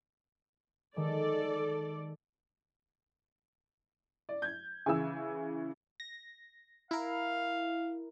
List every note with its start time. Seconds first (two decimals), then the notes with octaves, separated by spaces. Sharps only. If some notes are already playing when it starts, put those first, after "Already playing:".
0.96 D#3 G#3 A4 D5
4.29 D5
4.42 G6 G#6
4.86 C#3 E3 G#5 E6
6.00 A#6
6.91 E4 A#4 F5